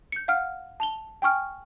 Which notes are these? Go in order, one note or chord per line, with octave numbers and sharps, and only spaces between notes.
G6 C#7
F5 F#5 F6
A5 F7 G7
G5 G#5 C#6 F6